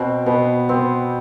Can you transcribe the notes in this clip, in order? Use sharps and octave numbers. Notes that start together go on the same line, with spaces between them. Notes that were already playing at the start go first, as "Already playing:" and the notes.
Already playing: B2 C4
B2 B3
B3 C4